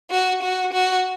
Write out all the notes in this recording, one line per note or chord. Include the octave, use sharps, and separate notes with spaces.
F#4
F#4
F#4